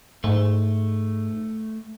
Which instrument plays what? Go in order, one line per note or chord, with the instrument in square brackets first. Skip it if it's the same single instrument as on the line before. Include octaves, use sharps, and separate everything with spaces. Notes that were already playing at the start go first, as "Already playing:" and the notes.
[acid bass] G#2 [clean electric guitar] A3